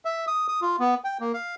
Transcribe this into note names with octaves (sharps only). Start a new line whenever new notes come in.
E5
D#6
D#6
F4
B3
G5
A#3
F5